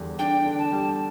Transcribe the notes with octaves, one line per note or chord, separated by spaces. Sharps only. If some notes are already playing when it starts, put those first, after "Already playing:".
Already playing: E2 D3 G3
D4 G5
D3
A5
G3